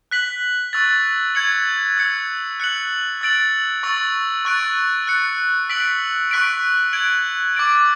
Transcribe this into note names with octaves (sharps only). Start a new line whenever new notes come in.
F#6 B6 F#7
C#6 E6 A6
C#6 G#6 C#7 F#7
E6 G#6 C#7
F#6 C#7 F#7
E6 A6 D7 F#7
C#6 E6 A6
C#6 F#6 A6 D7
F#6 A6 C#7
E6 B6 D7 F#7
C#6 F#6 B6 D7
G#6 D7 F#7
D6 A6 D7 F#7